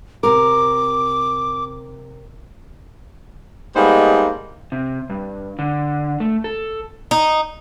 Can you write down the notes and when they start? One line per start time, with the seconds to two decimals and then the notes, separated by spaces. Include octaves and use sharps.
0.23 C3 A#4 D6
3.76 G3 G#3 A#3 B3 D#4 C5
4.72 C3
5.10 G2
5.59 D3
6.20 A3
6.44 A4
7.11 D#4